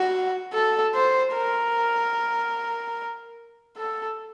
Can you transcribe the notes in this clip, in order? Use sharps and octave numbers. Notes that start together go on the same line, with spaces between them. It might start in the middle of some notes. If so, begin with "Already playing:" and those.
Already playing: F#4
A4
C5
A#4
A4